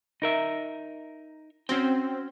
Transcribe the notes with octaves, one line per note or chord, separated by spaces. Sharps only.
D#4 A#4 E5
C4 C#4 F#4 G5